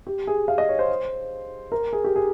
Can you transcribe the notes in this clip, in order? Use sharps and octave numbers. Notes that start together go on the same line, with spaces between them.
G4
G#4
F5
D#5
C#5
C5
A#4
G#4
G4
G#4